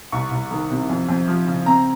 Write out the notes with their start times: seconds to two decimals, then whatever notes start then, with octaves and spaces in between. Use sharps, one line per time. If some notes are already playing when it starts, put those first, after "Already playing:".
0.12 C2 C#6
0.31 C2
0.51 D#3
0.70 C3
0.90 F2
1.09 F2
1.28 F3
1.47 C#3
1.66 C4 A#5